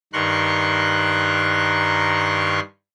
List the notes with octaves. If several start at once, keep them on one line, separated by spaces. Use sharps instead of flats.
G2 D#3 A#4 C6 C#6 F#6